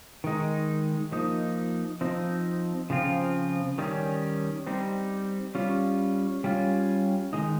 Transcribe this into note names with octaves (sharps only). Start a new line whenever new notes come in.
D#3 G#3 D#4
F3 A#3 D#4
F3 C4 D#4
C#3 F3 C4 F4
D#3 G3 A#3 C#4
G3 C4 D#4
G3 C#4 F4
G3 C#4 F4
D#3 G#3 D#4